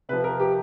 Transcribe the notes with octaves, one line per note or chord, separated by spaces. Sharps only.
C3 F3 B4
A#4
G4